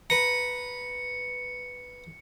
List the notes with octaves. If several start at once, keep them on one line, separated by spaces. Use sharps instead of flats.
B4 A#5 C#7